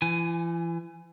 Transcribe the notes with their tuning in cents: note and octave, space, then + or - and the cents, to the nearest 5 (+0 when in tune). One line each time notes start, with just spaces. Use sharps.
E3 +40 G#5 +0